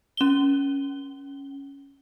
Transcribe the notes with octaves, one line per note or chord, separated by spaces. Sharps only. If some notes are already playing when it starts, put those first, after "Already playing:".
C#4 G7